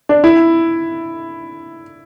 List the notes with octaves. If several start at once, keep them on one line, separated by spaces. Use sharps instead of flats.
D4
E4